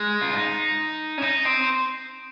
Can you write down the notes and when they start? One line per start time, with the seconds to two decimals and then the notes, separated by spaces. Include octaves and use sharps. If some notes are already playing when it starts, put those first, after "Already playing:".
Already playing: G#3
0.21 F4
0.33 D#4
1.18 C#4
1.22 D#4
1.45 C4